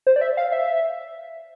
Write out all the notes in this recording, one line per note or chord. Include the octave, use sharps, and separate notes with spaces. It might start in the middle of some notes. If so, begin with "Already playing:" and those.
C5
D5
E5
F5
E5